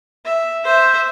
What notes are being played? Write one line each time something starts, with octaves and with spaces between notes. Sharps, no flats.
E5
C5 E5